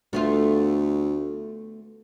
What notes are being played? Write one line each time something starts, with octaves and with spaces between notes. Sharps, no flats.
D2 A3 B3 F4